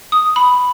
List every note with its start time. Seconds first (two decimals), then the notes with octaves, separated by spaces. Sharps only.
0.12 D#6
0.36 B5